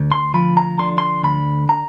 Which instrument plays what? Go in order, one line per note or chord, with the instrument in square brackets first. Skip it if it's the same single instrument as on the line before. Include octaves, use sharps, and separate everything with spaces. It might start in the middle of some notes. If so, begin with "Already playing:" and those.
Already playing: [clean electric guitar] D2
C6
F3 B5
A#5
D3 C6
C6
D2 B5
A#5